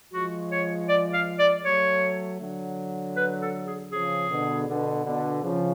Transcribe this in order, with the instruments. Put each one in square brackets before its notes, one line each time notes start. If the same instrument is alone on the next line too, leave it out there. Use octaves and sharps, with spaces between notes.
[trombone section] F3 G#3 [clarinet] F#4
[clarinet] C#5
D5
F5
D5
[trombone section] F#3 A3 [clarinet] C#5
[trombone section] D3 F#3
[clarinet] B4
A4
G#4
[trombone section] C#3 F3 [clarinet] G#4
[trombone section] B2 D3
B2 D3
B2 D3
C#3 F3